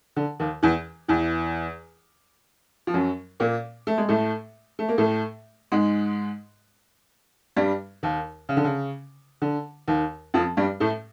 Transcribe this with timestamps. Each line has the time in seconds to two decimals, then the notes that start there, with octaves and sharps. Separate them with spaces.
0.16 D3
0.40 D#2 D#3
0.63 E2 E3
1.08 E2 E3
2.87 F3
2.94 F#2 F#3
3.40 A#2 A#3
3.87 A3
3.98 G#3
4.09 A2 A3
4.79 A3
4.89 A#3
4.98 A2 A3
5.72 G#2 G#3
7.57 G2 G3
8.03 D#2 D#3
8.49 C#3
8.57 D3
8.64 C#3
9.42 D3
9.88 D#2 D#3
10.34 F2 F3
10.57 G2 G3
10.80 A2 A3